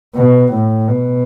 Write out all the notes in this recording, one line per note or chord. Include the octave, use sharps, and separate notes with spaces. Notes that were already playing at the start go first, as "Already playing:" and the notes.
B2
A2
B2